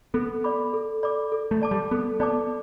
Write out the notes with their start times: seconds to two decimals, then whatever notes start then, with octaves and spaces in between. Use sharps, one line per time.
0.14 B3 A4
0.44 D5 B5 D6
0.74 A4
1.03 D5 B5 D6
1.32 A4
1.51 A3
1.62 D5 A5 D6
1.71 G3
1.91 B3 A4
2.20 B3 D5 A5 D6